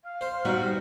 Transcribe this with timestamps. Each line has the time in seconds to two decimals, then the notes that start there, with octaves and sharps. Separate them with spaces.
0.03 F5
0.21 C5
0.45 G3 B3 D#4 F#4